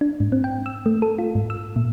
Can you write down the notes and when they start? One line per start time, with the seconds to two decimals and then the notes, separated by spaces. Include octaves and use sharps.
0.01 D4
0.20 G#2
0.32 C4
0.44 G5
0.66 E6
0.86 A3
1.02 A4
1.18 F4
1.35 G#2
1.50 E6
1.76 A#2